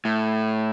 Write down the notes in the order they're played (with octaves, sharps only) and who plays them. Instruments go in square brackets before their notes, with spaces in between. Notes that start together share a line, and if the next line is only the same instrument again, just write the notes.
[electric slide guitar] A2